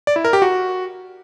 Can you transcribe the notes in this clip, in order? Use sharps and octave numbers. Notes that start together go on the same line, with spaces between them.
D5
E4
A#4
G4
F#4